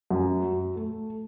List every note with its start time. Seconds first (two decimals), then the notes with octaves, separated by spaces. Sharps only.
0.11 F#2
0.43 F#3
0.76 A3